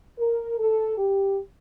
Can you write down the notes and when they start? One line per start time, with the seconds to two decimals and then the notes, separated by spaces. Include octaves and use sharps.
0.19 A#4
0.58 A4
0.98 G4